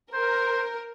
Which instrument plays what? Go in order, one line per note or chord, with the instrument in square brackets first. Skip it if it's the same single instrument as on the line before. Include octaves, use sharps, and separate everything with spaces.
[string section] A#4 [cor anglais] C5